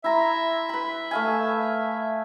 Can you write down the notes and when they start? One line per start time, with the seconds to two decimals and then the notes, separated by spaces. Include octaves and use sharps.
0.04 E4 E5 A#5 C6
0.69 B4 B5
1.11 A3 F5 G#5